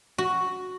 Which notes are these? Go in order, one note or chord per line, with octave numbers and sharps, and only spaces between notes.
F#4